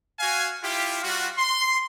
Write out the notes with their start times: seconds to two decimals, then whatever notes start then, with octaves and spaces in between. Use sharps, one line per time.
0.20 F#4 F5 G#5
0.63 E4 F4 G4
1.03 G3 F4 F#4
1.38 C6